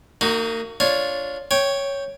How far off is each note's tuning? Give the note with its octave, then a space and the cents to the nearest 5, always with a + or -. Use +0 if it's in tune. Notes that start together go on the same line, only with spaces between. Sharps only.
A#3 -35 D#4 +0 F#4 +15
D4 -5 F4 +5 C#5 +0
C#5 +0 G5 +0